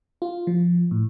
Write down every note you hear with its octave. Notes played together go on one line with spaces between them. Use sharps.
F4
F3
A2